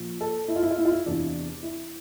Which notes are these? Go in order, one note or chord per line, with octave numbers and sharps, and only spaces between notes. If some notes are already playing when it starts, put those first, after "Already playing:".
Already playing: A#2 F3
A4
E4
F4
E4
F4
E4
F4
E4
E2 C3 E3 D4
E4